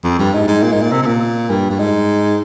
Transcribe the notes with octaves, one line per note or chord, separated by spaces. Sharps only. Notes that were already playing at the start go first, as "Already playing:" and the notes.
F2
G2
G#2
G#2
A#2
G#2
A#2
C3
C3
A#2
G2
G2
G#2